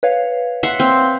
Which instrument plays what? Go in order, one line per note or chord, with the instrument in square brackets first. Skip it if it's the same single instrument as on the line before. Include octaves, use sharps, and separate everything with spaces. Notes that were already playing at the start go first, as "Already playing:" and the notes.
[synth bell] B4 C#5 F5
[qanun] E5 F#5 C6
C4